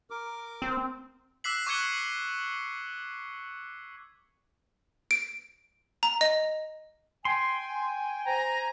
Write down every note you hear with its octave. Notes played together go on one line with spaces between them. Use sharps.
A#4 D6
C4
D6 E6 F#6 B6 C7 F#7
C#6 D6 F#6 G#6 C#7 G7
D7
A#5
D#5
G5 G#5 C6
C5 G#5 A#5